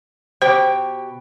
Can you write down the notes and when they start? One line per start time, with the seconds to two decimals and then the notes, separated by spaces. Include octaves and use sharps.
0.42 B2 G4 C5 G5